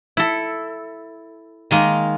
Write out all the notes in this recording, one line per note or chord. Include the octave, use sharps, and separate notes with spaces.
E4 A4
D#3 G#3 A#3